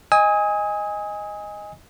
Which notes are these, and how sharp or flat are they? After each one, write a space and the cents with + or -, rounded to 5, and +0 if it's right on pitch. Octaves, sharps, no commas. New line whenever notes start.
D#5 +0 G#5 -15 D#6 +30